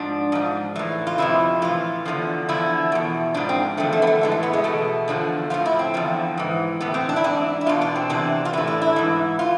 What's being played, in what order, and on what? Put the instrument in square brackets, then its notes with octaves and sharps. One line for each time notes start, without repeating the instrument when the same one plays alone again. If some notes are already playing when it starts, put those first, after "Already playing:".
Already playing: [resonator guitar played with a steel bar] G#2 F3 D4
G#2 F3
A2 E3
F4
F2 C3 F3 E4
A2 E3 F4
E2 D3 F3
E2 D3 F3 E4
E2 B2
G#2 F3 D4
C4
E2 D3 F3 A3
A3
B3
A3
A2 E3 G#3
A3
B3
G#3
E2 B2 A3
E2 D3 F3
A2 F3 F4
E4
C4
E2 D3 F3
G#2 E3
A2 E3 B3
C4
D4
E4
G#2 E3 D4
E4
E2 B2 F4
D4
C4
E2 C3 E3 D4
F4
A2 E3 E4
D4
E4
G#2 E3
E3 F4